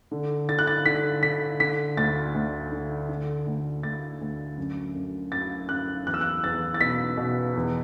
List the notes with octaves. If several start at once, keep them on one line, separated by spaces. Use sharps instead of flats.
D3
D3 A6
F#6
A6
D3 B6
D3 B6
D3 B6
D2 A6
D2
D3
D3
D2
D2 A6
D2
F#2
F#2
F#2 A6
F#2 F#6
E2 F#6
E6
F#6
E2 A6
A6
B2 B6
B2
E2